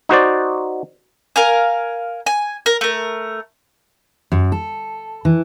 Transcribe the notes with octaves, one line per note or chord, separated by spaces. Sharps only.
D#4 F#4 C5 D5
A#4 F5 G#5
G#5
A#4
A3 A#4
F#2
A4
E3